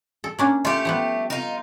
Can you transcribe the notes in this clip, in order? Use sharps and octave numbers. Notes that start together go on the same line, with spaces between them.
A4
A#3 C#4 D4
A3 F4 G4
F3 G3 B3
D#4 F4